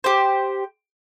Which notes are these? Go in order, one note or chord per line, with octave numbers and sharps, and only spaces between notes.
G4 C5